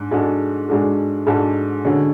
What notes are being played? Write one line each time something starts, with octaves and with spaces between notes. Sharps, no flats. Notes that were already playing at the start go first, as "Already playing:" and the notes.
Already playing: G#2 D4
G#2 G#3 D4 F#4 A4
G#2 G#3 D4 F#4 A4
G#2 G#3 D4 F#4 A4
D3 G#3 C#4 F#4